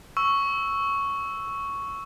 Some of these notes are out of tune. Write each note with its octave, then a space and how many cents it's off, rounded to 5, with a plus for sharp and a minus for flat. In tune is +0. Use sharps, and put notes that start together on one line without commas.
C#6 +0 E6 +0